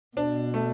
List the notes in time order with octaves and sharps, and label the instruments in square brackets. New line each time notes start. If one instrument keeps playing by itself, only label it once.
[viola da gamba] B2 [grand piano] D4
[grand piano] A3